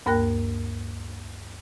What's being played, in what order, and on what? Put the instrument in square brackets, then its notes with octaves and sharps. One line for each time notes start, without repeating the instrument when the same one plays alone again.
[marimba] D2 G2 A#3 A#4 G5 F#6